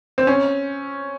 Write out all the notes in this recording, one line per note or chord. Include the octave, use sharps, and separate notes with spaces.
C4
C#4